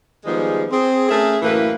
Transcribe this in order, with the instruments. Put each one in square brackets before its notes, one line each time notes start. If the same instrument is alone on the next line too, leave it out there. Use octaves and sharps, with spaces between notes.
[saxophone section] D#3 F3 G3 G#3 B3 G#4
C4 G#4
A3 C#4 G#4 A#4 E5
F#2 A2 E3 A#3 B4